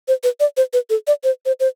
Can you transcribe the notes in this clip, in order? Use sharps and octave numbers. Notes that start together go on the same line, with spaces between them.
C5
B4
D5
C5
B4
A4
D5
C5
C5
C5